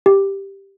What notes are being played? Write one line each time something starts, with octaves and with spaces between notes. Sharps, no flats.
G4